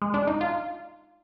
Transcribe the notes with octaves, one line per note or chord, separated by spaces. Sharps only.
G#3
D4
D#4
F4